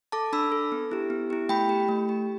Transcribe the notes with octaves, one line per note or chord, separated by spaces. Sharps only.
A4 A5 D6
D4 B5 E6
A4
B3
E4 G4
B3
E4 G4
A3 G5 B5
G4
A3
G4